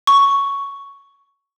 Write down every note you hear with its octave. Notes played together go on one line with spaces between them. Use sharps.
C#6